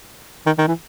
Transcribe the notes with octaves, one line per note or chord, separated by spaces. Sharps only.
D#3
D#3
E3